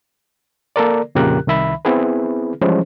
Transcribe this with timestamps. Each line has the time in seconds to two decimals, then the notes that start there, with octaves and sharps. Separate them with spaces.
0.76 A#3 A4 A#4 D5
1.15 F2 A#2 C#3 G4 A#4 F#6
1.47 C2 D#3 E5 B5
1.85 B3 C4 E4 G#4 B4
2.61 E3 F3 G3 G#3 C#4 C5